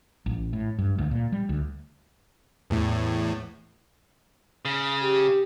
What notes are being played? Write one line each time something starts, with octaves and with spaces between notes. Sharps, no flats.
A1
A2
G2
D2
A#2
G3
D2
E2 A2
C#3
G4